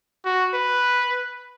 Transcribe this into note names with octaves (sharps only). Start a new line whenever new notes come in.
F#4
B4